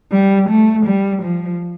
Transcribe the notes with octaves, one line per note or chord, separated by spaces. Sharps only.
G3
A3
G3
F3